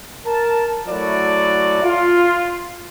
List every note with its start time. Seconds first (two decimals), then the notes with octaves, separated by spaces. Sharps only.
0.25 A#4 A5
0.88 F#3 A3 E4 F#4 D5
1.84 F4